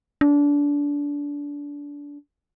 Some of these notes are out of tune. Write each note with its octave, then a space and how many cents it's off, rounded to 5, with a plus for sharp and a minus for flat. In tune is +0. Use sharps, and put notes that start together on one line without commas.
D4 -25